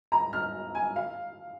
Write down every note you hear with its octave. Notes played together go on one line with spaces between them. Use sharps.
A#5
F6
G#5
F5